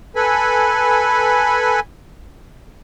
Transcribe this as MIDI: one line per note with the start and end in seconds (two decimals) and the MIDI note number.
0.16 1.80 69
0.16 1.80 71
0.16 1.80 80
0.16 1.80 83